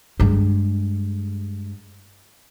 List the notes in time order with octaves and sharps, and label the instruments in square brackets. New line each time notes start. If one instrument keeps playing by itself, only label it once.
[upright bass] G2 G#3